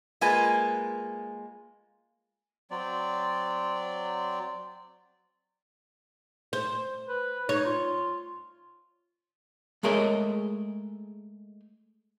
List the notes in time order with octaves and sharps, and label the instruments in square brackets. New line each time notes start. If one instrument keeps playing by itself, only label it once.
[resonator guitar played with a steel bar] G#3 A#3 F4 B4 G#5
[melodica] F#3 C4 D5
[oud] C5
[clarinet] B4
[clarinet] D#4 [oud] C#5
[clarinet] F4
[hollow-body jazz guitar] G#3 A3 G#4 A#4 C#5 D#5